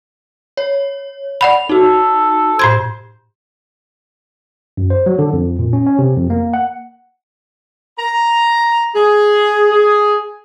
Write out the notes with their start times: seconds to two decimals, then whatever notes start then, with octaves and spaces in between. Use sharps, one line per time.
0.57 C#5
1.41 D5 F#5 B5 F7
1.69 D#4 F#4 A4
2.59 A2 C5 C6 G#6
4.77 F#2
4.90 C5
5.06 F#3
5.19 D3
5.33 F2
5.59 A#2
5.73 C#4
5.86 C#4
5.99 C3
6.16 F2
6.30 A#3
6.54 F#5
7.99 A#5
8.96 G#4
9.73 G#4